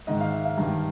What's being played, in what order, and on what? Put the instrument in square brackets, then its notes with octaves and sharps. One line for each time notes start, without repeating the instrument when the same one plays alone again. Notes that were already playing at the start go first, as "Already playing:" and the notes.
[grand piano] G#2 D#3 D#5
F5
E5
F5
G2 D#3